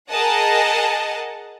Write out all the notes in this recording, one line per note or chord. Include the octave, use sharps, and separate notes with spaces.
G#4 A#4 D#5 F#5 A5